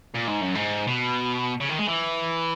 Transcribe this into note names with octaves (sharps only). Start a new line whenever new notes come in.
A#2
G#2
F#2
G#2
B2
C#3
D#3
G#3
E3